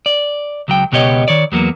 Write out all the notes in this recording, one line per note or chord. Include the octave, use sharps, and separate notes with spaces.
D5
C#2 F#3 G5
C#2 B2 B3 G4 C#5 D#5
D#3 C#5 D5
E2 F#3 A#3 B3